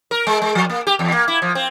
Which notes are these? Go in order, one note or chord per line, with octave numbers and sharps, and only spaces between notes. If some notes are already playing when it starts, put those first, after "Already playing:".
A#4
G#3
G#3
F3
A#3
G4
E2
A#3
E4
F3
C4